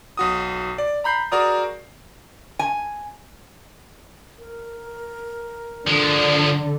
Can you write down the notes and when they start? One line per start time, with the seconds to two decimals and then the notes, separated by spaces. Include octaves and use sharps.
0.17 B1 F#4 D#6
0.78 D5
1.04 A#5 B5 G6 C7
1.32 F#4 G#4 A#4 D5 A#5 D#6
2.59 G#5
4.39 A#4
5.87 D3 F3 G#3